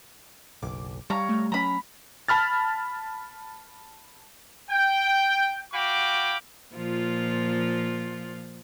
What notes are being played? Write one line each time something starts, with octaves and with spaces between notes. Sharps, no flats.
F#1 B1 D6
G3 C#5 F5 A#5
A3
F#3 C#4 A#5 B5
A5 B5 F6 A6
G5
F#4 F5 G5 B5 D6
A#2 F3 F4